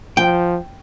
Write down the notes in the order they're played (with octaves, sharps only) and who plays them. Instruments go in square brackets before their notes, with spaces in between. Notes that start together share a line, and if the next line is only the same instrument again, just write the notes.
[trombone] F3 [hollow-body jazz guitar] G5